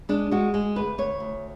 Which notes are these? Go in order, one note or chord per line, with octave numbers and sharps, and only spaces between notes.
G#3 D4
G#3 F#4
G#3
D2 B4
D2 C#5
D2